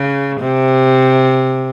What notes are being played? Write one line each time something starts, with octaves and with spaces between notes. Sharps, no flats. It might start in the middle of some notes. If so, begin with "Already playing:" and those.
Already playing: C#3
C3